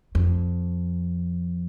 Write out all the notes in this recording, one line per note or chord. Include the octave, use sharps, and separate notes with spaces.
F2